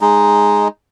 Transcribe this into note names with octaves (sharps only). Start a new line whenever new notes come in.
G#3 D#4